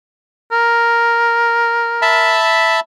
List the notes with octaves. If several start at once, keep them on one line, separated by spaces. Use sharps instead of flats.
A#4
E5 A5 B5